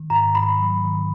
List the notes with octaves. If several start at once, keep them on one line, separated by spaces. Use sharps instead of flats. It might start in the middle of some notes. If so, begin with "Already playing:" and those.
Already playing: D#3
G#2 A#5
G#2 B5
F#3
D#3